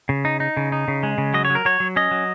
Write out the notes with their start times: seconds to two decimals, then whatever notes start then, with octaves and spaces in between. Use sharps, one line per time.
0.09 C#3
0.25 D#4
0.40 D#4
0.57 C#3
0.72 D#4
0.88 C#3
1.03 G#3
1.18 C#3
1.34 F#3 D#5
1.45 C#5
1.50 F#3
1.55 A#4
1.65 F#3 C#5
1.80 F#3
1.96 C#4 D#5
2.11 F#3